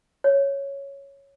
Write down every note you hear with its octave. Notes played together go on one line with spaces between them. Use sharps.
C#5